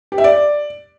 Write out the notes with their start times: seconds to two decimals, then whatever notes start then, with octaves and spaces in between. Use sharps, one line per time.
0.12 G4
0.18 E5
0.24 D5